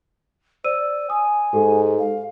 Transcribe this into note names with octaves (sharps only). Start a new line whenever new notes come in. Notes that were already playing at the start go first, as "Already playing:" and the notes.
C5 D5 E6 D#7
G#5 D#6
G#2 G4 A4
F5